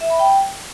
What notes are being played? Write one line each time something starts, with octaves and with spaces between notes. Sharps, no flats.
E5
B5
G5